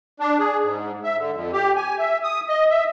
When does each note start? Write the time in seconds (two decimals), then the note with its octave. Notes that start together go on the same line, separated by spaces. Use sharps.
0.20 D4
0.39 G#4
0.62 G#2
1.03 E5
1.18 D3
1.33 F2
1.53 G4
1.76 G#5
1.99 E5
2.23 D#6
2.49 D#5
2.70 E5